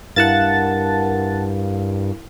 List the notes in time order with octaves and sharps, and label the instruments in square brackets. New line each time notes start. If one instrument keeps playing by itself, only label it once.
[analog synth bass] G2 [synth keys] E4 A#4 F5 [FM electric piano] F#5 A5 A6